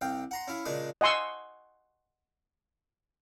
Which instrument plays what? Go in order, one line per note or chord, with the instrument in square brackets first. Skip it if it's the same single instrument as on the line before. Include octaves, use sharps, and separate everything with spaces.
[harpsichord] C2 F5 G5
F#5 A#5 C6
C#4 E4 F5
A#2 C#3 G#3 D4 D#6
[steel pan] D#5 F#5 G#5 C6 C#6 E6